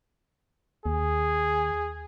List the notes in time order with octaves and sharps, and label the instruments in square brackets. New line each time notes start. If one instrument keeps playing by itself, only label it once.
[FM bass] D#2 [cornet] G#4